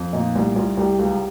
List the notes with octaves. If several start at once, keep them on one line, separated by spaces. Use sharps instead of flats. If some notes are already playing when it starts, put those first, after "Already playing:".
Already playing: F2
A#2 D#4
C2
C2 F4
C2 G4
C#2 G4